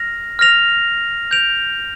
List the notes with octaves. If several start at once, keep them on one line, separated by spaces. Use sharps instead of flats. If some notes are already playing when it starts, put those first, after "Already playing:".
Already playing: F6 A#6 F7
F6 A#6 F7
G6 D7 F7